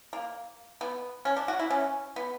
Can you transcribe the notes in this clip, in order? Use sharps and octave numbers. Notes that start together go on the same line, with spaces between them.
A#3
B3
C#4
D4
F#4
E4
C#4
B3